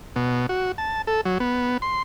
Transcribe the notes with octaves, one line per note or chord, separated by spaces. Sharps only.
B2
F#4
A5
A4
F#3
B3
C6